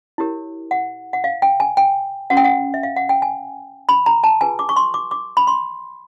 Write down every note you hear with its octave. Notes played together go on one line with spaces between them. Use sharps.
E4 G4 A#4 C#5
F#5
F#5
F5
G5
G#5
G5
C#4 F#4 B4 F#5
G5
F#5
E5
F5
F#5
G5
G#5
B5
A#5
A5
F4 G#4 B4 G#5
D6
C#6
C6
D6
D6
B5
C6